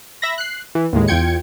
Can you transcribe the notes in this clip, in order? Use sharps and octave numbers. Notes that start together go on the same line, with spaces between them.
E5 B5 A#6
F#6 C7
E3
D#2 A2 G#3
E2 F4 G5 G#6 C#7